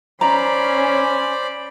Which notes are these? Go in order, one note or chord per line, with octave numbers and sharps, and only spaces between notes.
C#4 C5 D5 A#5 B5